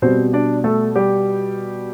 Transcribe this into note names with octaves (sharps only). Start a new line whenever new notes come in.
B2 G3 C4 C5
D4 D5
A3 A4
G3 G4